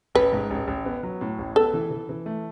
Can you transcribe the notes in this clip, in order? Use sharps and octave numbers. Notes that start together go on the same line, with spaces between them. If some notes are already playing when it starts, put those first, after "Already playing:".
A1 B4
G#2
A1
A1
B3
F#3
A2
A1
B3 A4
E3
E3
E3
A3